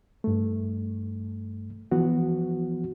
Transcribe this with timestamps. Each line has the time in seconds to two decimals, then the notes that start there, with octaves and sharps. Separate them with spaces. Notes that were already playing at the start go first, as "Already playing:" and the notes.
0.24 G2 A3
1.91 E3 F3 B3 F#4